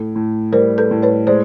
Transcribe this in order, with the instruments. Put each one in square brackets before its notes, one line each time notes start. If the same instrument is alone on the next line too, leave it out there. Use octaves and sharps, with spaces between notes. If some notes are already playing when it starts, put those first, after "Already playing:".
Already playing: [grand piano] A2 [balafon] A4
[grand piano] A2
[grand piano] G3 [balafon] A#4 C5
[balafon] A4 B4
[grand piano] A2
[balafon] B4 C#5
[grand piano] G#3 [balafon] C5 D5